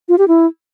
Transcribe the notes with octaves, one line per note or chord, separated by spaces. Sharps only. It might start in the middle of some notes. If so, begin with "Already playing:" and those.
F4
G4
E4